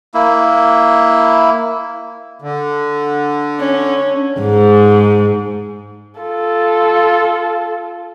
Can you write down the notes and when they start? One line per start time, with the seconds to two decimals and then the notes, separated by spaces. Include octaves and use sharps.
0.14 A#3 E4
2.42 D3
3.60 C#4
4.41 G#2
6.21 F4 A4